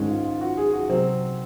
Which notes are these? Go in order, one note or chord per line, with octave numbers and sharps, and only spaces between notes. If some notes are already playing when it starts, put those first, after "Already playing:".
Already playing: G#2 D#3 G#3 C#4
F4
F4
F#4
G#4
F#4
C3 F#3 C4